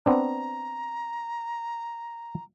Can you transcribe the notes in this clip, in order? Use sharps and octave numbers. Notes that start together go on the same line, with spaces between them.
B3 C4 D4 A#5